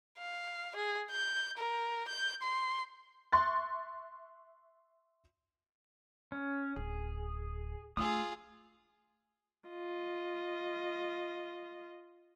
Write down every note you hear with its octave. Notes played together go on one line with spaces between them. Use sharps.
F5
G#4
G6
A#4
G6
C6
E5 C6 C#6 F#6 A6
C#4
D1 G#4
A3 D4 F4 G#4 D#6 E6
F4 D#5